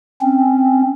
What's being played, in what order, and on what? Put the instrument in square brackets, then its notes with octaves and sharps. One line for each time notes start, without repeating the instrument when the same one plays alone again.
[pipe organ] C4 C#4